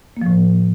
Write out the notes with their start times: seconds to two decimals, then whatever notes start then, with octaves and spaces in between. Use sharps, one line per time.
0.17 A#3
0.22 F3
0.26 A2